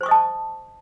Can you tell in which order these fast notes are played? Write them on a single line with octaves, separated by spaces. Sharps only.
C5 C#6 D#6 D#5 A5